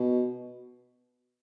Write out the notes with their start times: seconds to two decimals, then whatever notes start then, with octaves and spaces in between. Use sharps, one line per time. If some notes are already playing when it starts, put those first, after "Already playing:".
Already playing: B2